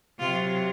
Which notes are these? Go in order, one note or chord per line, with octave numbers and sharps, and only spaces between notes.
C3 F#3 F4